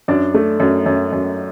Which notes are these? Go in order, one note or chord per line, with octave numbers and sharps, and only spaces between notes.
F#2 D4 D5
A3
F#2
F#2
F#2